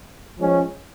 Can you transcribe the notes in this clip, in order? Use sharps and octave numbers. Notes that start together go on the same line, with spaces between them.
F3 G#3 C#4